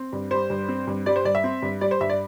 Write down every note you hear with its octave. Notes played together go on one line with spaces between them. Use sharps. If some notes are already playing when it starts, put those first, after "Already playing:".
Already playing: C4
G2
G3 C5
G2
C4
G2
G3 D5
C5
G2 D5
E5
C4
G2
G3 D5
C5
G2 E5
D5